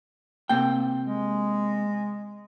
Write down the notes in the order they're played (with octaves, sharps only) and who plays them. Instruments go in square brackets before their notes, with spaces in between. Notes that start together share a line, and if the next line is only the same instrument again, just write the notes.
[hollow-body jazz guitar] C3 A#3 G5
[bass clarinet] G#3